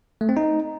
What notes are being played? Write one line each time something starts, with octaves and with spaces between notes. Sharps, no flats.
A3
C4
D#4